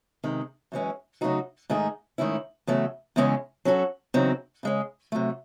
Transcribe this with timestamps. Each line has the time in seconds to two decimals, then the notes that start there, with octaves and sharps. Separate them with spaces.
0.24 C3 D#3 G#3
0.72 F#2 E3 G#3 C#4
1.21 C#3 F#3 A3 D#4 F#4
1.70 G#2 D#3 A3 D#4 G#4
2.18 G#2 D#3 A3 C#4 E4
2.67 E2 C#3 F#3 A3
3.16 E2 C#3 G#3 C#4 E4
3.65 F#3 C#4 F#4 A4
4.14 E2 C#3 F#3 C4 D#4
4.63 C#3 G#3 C#4
5.12 C3 F#3 A3